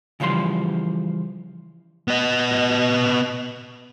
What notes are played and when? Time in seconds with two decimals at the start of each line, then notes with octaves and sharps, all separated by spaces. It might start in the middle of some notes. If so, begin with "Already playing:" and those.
0.20 C#3 E3 F3 G3 C6
2.08 B3 D#5